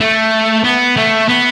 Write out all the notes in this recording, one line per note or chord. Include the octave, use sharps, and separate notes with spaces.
A3
B3
A3
B3